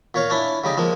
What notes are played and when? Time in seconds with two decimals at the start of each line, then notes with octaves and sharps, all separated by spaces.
0.14 A#2 C#5 F5
0.30 C#4 D4 E4
0.64 C#3 G3 D#4
0.77 F3 G#3 A#3